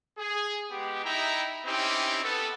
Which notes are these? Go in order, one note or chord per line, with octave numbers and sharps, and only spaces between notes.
G#4
G#3 B3 G4
D#4 E4 E5 G5 A#5
C4 C#4 D#4 E4 G4
B3 A4